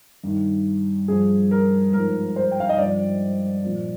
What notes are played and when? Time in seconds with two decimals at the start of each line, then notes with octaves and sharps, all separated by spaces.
0.24 G2 D#3
1.08 G2 F3 G#4
1.51 A#4
1.93 G#2 F3 A#4
2.36 C5
2.51 G5
2.60 F5
2.69 D#5
2.78 G2 F3 D5
3.63 A#2 F3